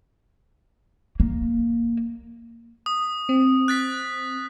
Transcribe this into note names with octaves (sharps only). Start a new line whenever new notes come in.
A#3
D#6
C4
F#6 A6 B6